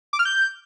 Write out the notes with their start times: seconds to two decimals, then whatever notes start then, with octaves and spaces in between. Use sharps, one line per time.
0.13 D6
0.19 F6
0.25 G6